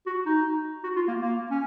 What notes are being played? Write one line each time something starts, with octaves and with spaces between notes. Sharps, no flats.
F#4
D#4
F#4
F4
A#3
A#3
C#4